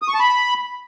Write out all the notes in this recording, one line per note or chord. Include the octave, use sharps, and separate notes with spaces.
D#6
C#6
A5
B5